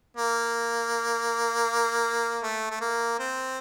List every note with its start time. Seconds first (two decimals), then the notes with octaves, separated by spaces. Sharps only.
0.17 A#3
2.43 A3
2.70 A3
2.81 A#3
3.19 C4